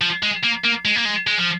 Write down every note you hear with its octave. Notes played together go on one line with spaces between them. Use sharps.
F3
G#3
A#3
A#3
G#3
A#3
G#3
G#3
F3